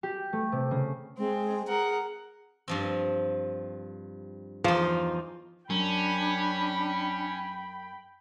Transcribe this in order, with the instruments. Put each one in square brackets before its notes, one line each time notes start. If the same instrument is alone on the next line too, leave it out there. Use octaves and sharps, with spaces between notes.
[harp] G4
A3
C3
C#3
[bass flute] G#3 [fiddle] C4
[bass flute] G#4 [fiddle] A#4 F#5
[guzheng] G2 F3 C4
[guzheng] E2 D#4 [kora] F3
[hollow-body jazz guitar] F#2 [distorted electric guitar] C#4 [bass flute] D4 [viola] G5 B5